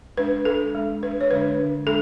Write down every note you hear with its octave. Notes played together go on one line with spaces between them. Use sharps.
G#3 D4 B4
G#3 D4 A4
G#3 D4
G#3 D4 B4
C#5
D3 G#3 D4 B4
D3 G#3 D4
G#3 D4 A4